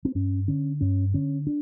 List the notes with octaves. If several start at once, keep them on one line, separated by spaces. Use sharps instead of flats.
C4
G2 C#4
D3 C#4
G2 C#4
D3 C#4
D4